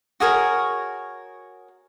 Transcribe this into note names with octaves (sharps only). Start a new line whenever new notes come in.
F#4 G#4 A#4 C#5